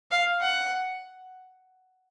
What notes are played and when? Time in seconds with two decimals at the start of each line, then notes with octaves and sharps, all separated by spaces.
0.11 F5
0.41 F#5